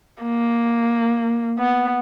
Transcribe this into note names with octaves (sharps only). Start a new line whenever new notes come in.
A#3
B3